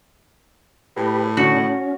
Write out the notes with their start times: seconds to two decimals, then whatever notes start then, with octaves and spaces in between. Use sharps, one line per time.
0.97 A2 G4 B4
1.37 D3 C#4 F#4
1.58 C#4